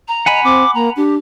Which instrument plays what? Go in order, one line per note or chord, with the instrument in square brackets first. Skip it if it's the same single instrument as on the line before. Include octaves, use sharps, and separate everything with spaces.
[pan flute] A#5
[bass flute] D#5 [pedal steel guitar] F#5 G#5 B5
[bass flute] C4 [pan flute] D6
[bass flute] A#3 [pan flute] A#5
[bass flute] D4 [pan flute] G4